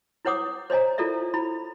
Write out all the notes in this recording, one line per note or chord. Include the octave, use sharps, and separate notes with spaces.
E4 B4 C#5 F#5 D6 D#6
C5 C#5 D#5 G#5 A#5
E4 F4 A4 A#4 D5 E5
E4 B5